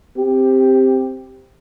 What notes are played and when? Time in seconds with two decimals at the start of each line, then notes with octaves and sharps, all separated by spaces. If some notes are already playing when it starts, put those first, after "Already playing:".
0.17 C4 G4